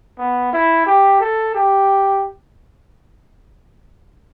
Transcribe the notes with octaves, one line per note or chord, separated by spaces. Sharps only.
B3
E4
G4
A4
G4